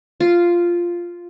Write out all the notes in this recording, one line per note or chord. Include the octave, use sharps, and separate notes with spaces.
F4